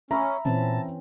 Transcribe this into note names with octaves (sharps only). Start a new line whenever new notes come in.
C#4 E5 A#5 B5
A#2 E3 C4 C#4 A5